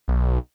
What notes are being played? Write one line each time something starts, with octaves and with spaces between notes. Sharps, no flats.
B1